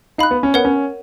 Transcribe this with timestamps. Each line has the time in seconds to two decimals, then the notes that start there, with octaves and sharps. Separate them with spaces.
0.18 D#4 F5 B5 F#6
0.31 B3
0.43 C#4
0.54 B3 A#4 C#5 F#5
0.65 C#4